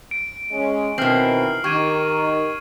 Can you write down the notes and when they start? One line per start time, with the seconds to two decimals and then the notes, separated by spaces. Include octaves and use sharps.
0.11 D7
0.51 G#3 C#4
0.98 B2 D#3 E3 C4 F6 C7 F#7
1.64 D#3 G4 C#6 G#6 D#7